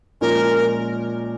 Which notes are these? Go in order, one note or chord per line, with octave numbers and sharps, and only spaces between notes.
A#2 F3 G#3 C#4 A#4